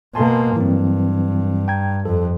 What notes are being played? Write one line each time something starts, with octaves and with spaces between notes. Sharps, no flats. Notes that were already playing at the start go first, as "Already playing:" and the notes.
B2 A#3 G#5 A5 C6
G2 E3 F#3 C4
G5 A#5 G#6
F2 A4